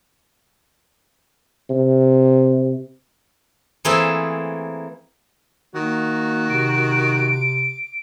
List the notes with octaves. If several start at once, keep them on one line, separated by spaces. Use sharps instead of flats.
C3
E3 A3 A#3 C4 G#4 E5
D#3 A#3 F#4
C3 D7